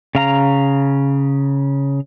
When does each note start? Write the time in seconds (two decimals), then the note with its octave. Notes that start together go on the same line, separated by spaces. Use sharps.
0.15 C#3 F5 A#5